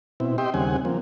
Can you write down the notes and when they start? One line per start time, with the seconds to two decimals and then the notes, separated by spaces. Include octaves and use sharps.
0.20 B2 C4 E4
0.38 G4 D#5 E5 G5 C6
0.54 D#2 C#3 G3 C4 F#5 G#5
0.85 F3 A#3 C4